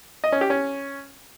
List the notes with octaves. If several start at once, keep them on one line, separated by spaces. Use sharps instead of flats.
D#5
C#4
G4
C#4